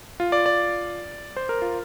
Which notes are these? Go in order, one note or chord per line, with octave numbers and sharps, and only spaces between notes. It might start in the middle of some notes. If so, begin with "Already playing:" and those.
F4
D5
D5
C5
A#4
F4